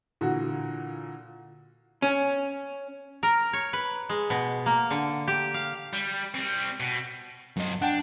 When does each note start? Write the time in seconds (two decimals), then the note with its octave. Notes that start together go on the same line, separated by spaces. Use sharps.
0.21 A#2 D3 E3 F#4
2.02 C#4
3.23 A#4
3.53 C#5
3.73 B4
4.09 G#3
4.30 B2
4.66 A#3
4.91 D3
5.28 G4
5.54 F5
5.93 G3
6.34 G3 C4
6.80 B2
7.57 F#2 D#5
7.82 D4 F#5 G5